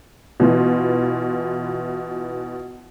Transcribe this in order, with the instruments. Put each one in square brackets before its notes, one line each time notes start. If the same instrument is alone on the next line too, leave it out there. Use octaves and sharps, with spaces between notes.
[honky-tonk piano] B2 E3 F4